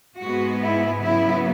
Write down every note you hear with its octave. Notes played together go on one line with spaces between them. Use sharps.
G#2 G#3 B3 F#4
E4
C#3 F#3 B3 E4